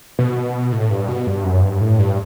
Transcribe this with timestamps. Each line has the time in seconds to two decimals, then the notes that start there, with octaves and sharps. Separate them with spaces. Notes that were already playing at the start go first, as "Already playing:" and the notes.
0.19 B2
0.72 A2
0.91 G2
1.08 B2
1.27 G2
1.44 F#2
1.62 G2
1.81 A2
1.99 G2